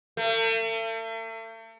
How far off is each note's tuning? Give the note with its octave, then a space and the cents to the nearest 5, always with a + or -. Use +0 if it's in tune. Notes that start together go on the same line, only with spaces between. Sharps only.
A3 +40